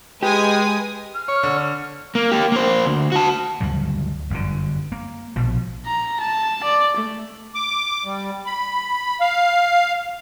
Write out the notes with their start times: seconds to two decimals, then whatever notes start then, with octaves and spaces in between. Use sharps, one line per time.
0.23 G#3 G4 B4 G#5 D#6
1.15 F6
1.28 C#5
1.43 D3
2.15 A#3
2.31 A#3 G4
2.52 A#3 C5
2.86 D2
3.12 F#4 A5
3.61 D2 G2 C#3 F#3
4.30 G1 F#2 A#2 D3
4.92 A#3
5.36 A#1 B2 F3
5.86 A#5
6.20 A5
6.63 D5
6.97 A3
7.55 D6
8.05 G3
8.46 B5
9.20 F5